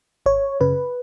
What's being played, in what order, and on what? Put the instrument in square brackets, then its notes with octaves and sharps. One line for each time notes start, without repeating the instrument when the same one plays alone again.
[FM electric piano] G#1 C#5
F#2 C#3 B4